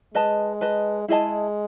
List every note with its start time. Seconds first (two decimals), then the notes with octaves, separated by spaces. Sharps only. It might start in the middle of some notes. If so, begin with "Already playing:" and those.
0.14 G#3 B4 D#5 A5
0.61 B4 D#5 A5
1.08 G#3 E4 G#4 D#5 A5